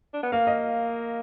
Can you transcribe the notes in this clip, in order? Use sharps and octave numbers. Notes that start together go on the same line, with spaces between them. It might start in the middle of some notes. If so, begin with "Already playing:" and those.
D4
B3
A#3 F5
D#5